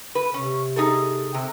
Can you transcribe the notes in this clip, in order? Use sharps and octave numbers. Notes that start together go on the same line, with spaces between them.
B4
C3 C#4
D#4 G#4 A4
C3